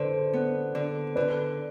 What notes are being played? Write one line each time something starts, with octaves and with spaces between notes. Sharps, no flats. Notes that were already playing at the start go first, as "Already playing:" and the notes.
Already playing: D3 B4 C5
B3
D3
D3 B4